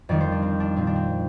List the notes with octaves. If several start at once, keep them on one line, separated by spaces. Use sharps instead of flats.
F2 D#3 G3 D5
C5
D4
C4
D4
A#2 F3 C4
D4
C4